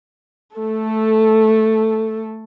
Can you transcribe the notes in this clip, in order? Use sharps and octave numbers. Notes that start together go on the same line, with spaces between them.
A3 A4